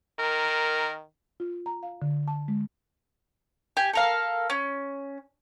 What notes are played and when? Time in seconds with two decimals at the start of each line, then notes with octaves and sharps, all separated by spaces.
0.19 D#3 A#4
1.40 F4
1.66 A#5
1.83 F5
2.02 D3
2.28 A5
2.48 G#3
3.77 G4 G#5
3.93 A4 A#4 F5
4.50 C#4